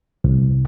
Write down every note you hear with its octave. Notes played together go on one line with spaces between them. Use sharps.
C2